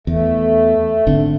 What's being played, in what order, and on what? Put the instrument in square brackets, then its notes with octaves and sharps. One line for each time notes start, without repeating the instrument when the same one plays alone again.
[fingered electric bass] E2 [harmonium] A3
[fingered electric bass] G#1 D3 C4